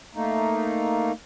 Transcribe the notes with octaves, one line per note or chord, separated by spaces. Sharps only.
A3 A#3 D#4